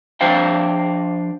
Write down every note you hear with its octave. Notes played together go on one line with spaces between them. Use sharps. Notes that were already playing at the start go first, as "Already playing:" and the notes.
F3 D4 C5 F5 G5